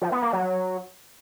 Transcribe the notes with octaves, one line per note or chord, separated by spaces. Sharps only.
F3
B3
A#3
F#3